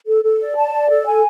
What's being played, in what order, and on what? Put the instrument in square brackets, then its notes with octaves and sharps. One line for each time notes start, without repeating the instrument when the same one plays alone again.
[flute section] A4
A4
D5
A5
D5
A4
G#5